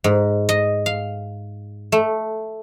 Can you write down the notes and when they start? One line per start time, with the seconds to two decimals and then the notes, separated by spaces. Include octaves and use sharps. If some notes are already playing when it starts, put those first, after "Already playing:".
0.04 G#2
0.49 D#5
0.86 F5
1.92 A3